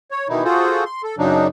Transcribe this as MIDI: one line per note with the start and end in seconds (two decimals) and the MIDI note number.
0.11 0.28 73
0.29 0.44 47
0.29 0.44 51
0.29 0.44 52
0.29 0.44 63
0.29 0.44 64
0.44 0.84 65
0.44 0.84 66
0.44 0.84 68
0.44 0.84 69
0.44 0.84 72
0.86 1.02 84
1.03 1.16 69
1.18 1.48 42
1.18 1.48 49
1.18 1.48 54
1.18 1.48 62
1.18 1.48 63